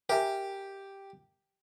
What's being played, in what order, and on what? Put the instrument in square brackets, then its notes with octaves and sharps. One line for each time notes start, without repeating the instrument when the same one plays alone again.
[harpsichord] G4 [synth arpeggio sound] A#4 E5 G#5